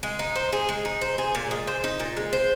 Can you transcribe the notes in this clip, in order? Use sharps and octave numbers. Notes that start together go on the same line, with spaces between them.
G#3
D#4
C5
G#4
G#3
D#4
C5
G#4
A#2
G#3
C5
D#4
A#2
G#3
C5